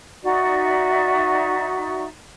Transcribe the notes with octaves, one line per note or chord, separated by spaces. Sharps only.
D#4 F#4 D5 E5